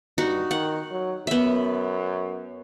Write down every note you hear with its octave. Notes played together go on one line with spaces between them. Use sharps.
G2 D#4 F#4
D#3 F#5
F#3
F#2 B3 E5